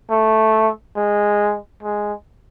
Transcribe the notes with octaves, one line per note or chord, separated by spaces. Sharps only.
A3
G#3
G#3